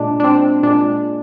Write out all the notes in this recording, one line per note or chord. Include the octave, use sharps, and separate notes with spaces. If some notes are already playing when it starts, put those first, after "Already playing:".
Already playing: A#2 G#3 D4
D4
C4
A#2 G#3 D4